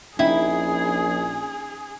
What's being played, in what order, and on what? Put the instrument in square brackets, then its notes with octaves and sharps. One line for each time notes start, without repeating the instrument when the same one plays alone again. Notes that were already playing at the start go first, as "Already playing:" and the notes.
[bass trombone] A#1 [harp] C#4 D#4 G5 [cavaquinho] E4 [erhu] G#4